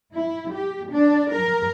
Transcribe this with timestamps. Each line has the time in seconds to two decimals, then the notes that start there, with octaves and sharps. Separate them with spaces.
0.14 E4
0.53 G4
0.91 D4
1.32 A#4